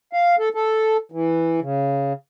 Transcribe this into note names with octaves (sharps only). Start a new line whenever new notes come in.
F5
A4
A4
E3
C#3